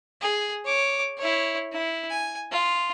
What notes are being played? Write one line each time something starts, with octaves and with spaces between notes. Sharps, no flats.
G#4
C#5 D6
E4 C#5
E4
G#5
F4